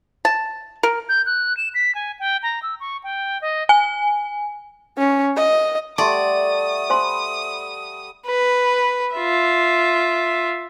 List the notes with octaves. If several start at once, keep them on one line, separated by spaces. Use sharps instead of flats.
A5
A#4
G6
F#6
E7
B6
G#5
G5
A#5
E6
C#6
G5
D#5
G#5
C#4
D#5
G3 A3 D5 F#5 A5 C6 D#6
C5 G#5 B5 C6 D6
B4
F4 E5